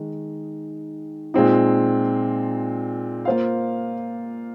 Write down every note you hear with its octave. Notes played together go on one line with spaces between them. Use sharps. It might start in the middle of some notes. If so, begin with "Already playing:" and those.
Already playing: D#3 G#3 D#4
A#2 G#3 C4 D#4
A#3 F4 C5 F5